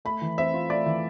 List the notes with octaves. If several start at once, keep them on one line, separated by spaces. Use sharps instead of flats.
A3 B5
E3
C4 E5
F4
A3 D5
E3